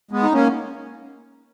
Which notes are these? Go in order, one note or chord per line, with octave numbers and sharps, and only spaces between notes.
G#3 B3
D#4
A#3 C#4